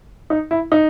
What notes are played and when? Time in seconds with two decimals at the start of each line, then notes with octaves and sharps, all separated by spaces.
0.30 D#4
0.51 E4
0.72 D#4